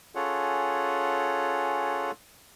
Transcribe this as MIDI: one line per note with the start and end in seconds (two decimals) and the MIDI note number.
0.15 2.11 61
0.15 2.11 65
0.15 2.11 68
0.15 2.11 69
0.15 2.11 73
0.15 2.11 78